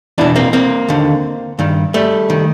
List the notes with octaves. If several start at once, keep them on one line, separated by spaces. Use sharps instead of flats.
E2 B2 D4 E4
A#3 C4
A#3 C4
D#2 D3
G2 D#3
G3 A3
D#3